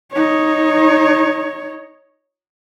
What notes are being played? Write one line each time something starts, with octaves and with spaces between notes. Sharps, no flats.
D#4 C#5